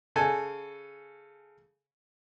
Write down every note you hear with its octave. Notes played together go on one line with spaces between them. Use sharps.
C#3 A4 G#5